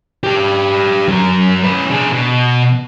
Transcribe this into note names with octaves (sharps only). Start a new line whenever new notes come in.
G4 B4
F#2 A#4
C#4 B4
D4 G#4
B2